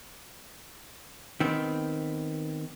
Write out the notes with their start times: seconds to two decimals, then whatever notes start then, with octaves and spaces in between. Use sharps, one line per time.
1.40 D#3 B3 C4